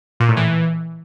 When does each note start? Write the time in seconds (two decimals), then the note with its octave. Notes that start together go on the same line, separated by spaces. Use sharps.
0.20 A#2
0.28 A2
0.37 E3